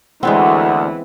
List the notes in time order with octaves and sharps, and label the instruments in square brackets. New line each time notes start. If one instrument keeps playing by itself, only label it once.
[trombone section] D2 [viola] E3 [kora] G#3 B3 C4 [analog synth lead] F#5